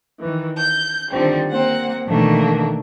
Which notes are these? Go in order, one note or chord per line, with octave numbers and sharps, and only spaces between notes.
D#3 E3
G6
D3 D#3 F3 G3 C4
A#3 C4 F#5
B2 D#3 E3 A3 A#3 D4